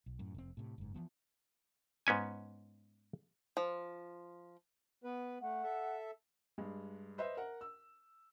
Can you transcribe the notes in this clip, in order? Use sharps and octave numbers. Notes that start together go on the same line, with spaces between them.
B1
F#2 A2
F1 C4
A2 C3
F#1 G#2
E3 F3 B3
G#2 B3 C#4 G#5
F3
B3 B4
A3 F#5
A4 E5
G2 G#3
B4 C5 D#5 E5
A#4 F#5
E6